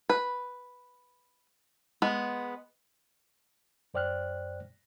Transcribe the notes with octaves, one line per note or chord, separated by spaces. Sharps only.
B4
G#3 B3
F#2 C5 D5 G5 F6 F#6